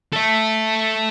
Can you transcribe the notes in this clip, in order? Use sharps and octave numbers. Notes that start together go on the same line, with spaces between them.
A4 E5